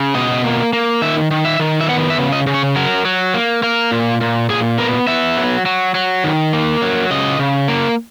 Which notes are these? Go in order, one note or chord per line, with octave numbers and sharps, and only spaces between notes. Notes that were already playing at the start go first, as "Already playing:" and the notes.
Already playing: C#3
B2 D#5
A#3
A#3
D#3 E5
D#3
E5
D#3
E5
B3 F#5
E5
C#3
D#5
C#3
C#5
F#3 A#4
F#3
A#3
A#3 A#4
A#2
A#2
A#2 G#4
B3 A#4
B3 E5
F#3
F#3
F#3
D#3
A#3
F#3
C#3 D#5
C#3
A#3